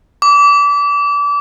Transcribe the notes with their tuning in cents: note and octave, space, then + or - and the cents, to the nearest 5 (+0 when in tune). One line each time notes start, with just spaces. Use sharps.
D6 -30